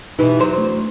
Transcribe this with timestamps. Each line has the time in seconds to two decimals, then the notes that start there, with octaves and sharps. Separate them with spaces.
0.19 B2 E3 D#4 G4 B4
0.39 E2 F#3 C5
0.57 A3 D4 C6